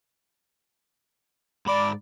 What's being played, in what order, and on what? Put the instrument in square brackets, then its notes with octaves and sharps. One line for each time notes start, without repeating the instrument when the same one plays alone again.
[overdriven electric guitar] G#2 B5 [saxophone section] D5